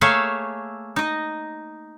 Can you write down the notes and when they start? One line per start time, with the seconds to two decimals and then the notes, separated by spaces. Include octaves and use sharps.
0.01 A3 A#3 G#4 C#5 E5 F5
0.96 D#4 D#5